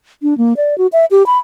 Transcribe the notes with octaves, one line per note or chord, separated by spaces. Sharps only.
D4
A#3
D5
F#4
E5
G4
B5